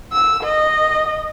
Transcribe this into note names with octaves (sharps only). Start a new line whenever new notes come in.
E6
D#5